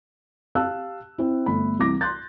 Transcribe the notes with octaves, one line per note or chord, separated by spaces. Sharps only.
G4 F5 A5 E6 F#6
C4 E4
G1 A3 B5
C2 E3 D6 A#6
C6 F#6 G6 A6